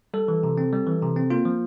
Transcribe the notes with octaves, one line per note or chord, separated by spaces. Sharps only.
G3 A4
E3
C3
C4
G3
E3
C3
C4
A#3 F4
F3